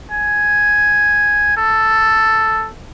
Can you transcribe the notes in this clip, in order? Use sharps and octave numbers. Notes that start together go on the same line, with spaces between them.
G#5
A4